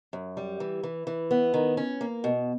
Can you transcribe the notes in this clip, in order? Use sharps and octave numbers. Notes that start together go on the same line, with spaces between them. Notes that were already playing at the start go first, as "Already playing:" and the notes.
F#2
G3
E3
E3
E3
B3
D#3
C#4
A#3
B2